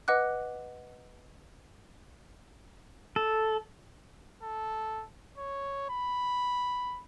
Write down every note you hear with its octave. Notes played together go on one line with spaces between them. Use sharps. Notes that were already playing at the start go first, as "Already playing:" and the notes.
B4 D#5 F#5 D6 F#6
A4
A4
C#5
B5